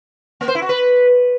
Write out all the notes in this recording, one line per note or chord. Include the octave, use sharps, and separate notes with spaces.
A#3
C5
E4
F#4
B4